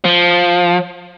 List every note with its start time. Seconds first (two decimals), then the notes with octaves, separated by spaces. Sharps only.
0.05 F3